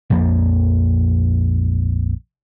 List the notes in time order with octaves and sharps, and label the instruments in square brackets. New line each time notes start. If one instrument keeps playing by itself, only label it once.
[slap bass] A#1 F2 F3 A#3